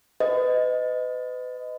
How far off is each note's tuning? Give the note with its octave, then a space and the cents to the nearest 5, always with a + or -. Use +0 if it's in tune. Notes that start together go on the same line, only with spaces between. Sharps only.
B4 +40 D#5 +0